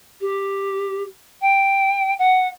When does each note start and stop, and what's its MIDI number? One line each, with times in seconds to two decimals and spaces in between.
0.20 1.03 67
1.41 2.14 79
2.18 2.47 78